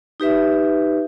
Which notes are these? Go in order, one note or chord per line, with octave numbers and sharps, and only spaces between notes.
D#4 G4 B4 E5